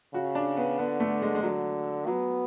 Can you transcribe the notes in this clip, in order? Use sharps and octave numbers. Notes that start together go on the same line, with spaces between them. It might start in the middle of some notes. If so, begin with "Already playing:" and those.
C#3 F#4
D4
B3
D3 B3
A3
G#3
G#3
D3 F#3
F#3 B3